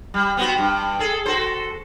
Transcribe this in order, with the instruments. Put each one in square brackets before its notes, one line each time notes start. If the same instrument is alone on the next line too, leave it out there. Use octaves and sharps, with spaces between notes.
[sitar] G3
B3 C4 F#4
G2
G#4 A4
F#4 A4 C5